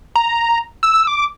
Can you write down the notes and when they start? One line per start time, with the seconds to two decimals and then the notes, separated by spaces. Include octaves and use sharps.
0.16 A#5
0.83 E6
1.07 D6